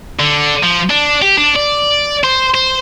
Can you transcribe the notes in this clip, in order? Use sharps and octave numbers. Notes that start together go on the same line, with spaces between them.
D3
F3
D4
G4
D4
D5
C5
C5